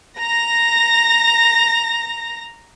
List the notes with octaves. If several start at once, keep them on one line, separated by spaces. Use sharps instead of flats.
A#5 A#6